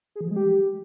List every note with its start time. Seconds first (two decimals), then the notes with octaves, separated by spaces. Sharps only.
0.15 G#4
0.21 E3
0.26 F3
0.31 G#3
0.36 G4